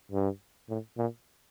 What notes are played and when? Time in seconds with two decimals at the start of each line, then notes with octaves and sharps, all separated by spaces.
0.12 G2
0.69 A2
0.98 A#2